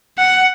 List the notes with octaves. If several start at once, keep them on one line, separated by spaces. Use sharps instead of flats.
F#5